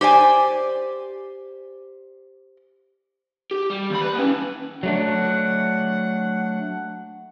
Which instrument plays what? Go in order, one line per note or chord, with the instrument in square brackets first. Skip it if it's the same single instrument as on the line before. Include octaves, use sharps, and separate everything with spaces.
[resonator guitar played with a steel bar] G4 C5 D5 G#5
[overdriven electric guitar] G4
G3
D#2 B5
B4
A#3 C#4
[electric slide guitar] F#3 A3 D4 [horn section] F#5